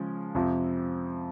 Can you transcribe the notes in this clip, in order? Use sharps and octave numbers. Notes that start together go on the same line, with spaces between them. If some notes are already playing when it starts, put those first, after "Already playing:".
Already playing: C#3 F3 G#3 C#4
F2 C3 F3